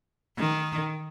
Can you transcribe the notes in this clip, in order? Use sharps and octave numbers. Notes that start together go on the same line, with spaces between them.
D#3